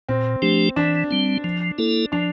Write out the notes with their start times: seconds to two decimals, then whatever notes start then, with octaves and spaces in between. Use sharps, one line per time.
0.09 A#2 C4
0.42 F3 A3 D4 G4
0.76 E3 D4
1.11 G3 C4
1.44 F3
1.78 A#3 E4 A4
2.12 F3 D4